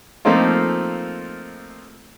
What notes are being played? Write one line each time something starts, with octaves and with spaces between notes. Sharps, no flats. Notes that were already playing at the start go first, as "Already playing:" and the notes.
F3 A3 A#3 C4 D#4 F4